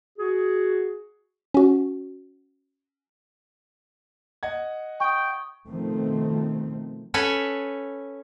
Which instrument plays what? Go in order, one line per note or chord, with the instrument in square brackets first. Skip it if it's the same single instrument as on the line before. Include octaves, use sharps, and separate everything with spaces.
[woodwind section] F#4 G#4
[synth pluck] C#4 F#4
[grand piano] D#5 F#5 G#6
[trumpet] G5 [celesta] C#6 D#6
[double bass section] B2 D#3 F3 A3 C4
[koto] C#4 A4 B4 C#5 G#5